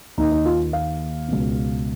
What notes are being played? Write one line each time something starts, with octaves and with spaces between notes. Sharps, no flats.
D#2 D#3 D#4
D#4
F4
F5
C#2 B2